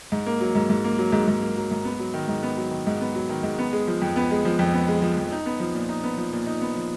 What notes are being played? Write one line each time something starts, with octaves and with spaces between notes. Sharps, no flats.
G#2
A#3
F#3
G#2
G#2
A#3
F#3
G#2
G#2
A#3
F#3
G#2
B3
F#3
D#3
G#2
B3
F#3
D#3
G#2
B3
F#3
D#3
G#2
B3
G#3
F3
F2
B3
G#3
F3
F2
B3
G#3
F3
F2
D#4
B3
F3
A#2
D#4
B3
F3
A#2
D#4
B3
F3